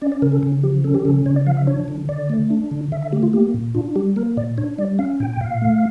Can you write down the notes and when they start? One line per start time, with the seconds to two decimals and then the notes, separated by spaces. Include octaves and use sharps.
0.01 C#4 D5
0.12 D5
0.22 C#3 A#4
0.32 A4
0.43 C#3
0.63 F3 G4
0.84 C#4 A4
0.95 G4
1.05 C#3 A4
1.26 C#3 C#5
1.36 D5
1.47 F3 F5
1.57 E5
1.67 D4 C#5
1.88 D3
2.09 D3 D5
2.29 A3
2.50 D4
2.71 D3
2.92 D3 E5
3.02 E5
3.12 A3 G4
3.23 F4
3.33 A#3 G4
3.54 A#2
3.75 D4 F4
3.96 G3 G4
4.16 A#3 A#4
4.37 A#2 D5
4.58 D4 C#5
4.78 G3 D5
4.99 C#4 F5
5.20 A#2 G5
5.33 G5
5.41 A#2 F5
5.62 A3